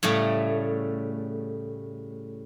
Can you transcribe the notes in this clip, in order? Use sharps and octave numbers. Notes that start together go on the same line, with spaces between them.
A2 C#3 G3 A3